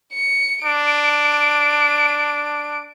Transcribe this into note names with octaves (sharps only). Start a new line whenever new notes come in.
C#7
D4 D7